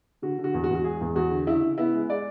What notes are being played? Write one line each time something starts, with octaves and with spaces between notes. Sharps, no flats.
D3 F#4
D3
F#4
E2
F#4
E2
F#4
G#3 G#4
E2
E2 F#4
D3
C#3 E4
C#3
B3 E4
G#3
G#3 D5